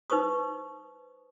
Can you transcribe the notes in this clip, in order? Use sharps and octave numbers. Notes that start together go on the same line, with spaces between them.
D#4 B4 C5 C#6 D#6